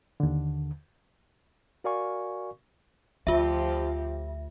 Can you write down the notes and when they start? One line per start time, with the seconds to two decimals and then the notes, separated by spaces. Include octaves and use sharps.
0.20 D#2 D3
1.84 F#4 A#4 D5 F5 G#5 C#6
3.27 D2 F3 F4 G4 E5